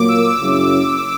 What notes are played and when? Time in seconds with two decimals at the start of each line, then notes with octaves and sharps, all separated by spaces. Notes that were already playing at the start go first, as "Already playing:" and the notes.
Already playing: A#2 F#3 A#3 D6
0.08 E6
0.26 E6
0.41 F#2 C#3 F#3 C#4 E4